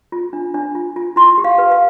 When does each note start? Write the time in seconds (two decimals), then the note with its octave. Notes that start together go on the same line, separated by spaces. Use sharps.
0.12 F4
0.33 D4
0.54 D4
0.75 F4
0.96 F4
1.16 E4 C6
1.38 G4
1.44 F5
1.58 B4
1.72 F5